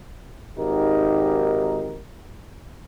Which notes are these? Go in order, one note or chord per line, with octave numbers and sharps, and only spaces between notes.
G#1 D#4 G4 A#4